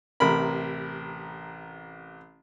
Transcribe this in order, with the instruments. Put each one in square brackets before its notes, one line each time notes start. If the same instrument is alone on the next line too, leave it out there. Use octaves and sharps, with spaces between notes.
[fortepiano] A1 C3 A#4 B5